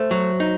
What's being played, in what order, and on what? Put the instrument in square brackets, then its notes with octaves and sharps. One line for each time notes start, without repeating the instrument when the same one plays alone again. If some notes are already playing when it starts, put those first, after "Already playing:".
Already playing: [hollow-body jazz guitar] A3 [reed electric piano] C5
[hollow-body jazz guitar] F#3
D#4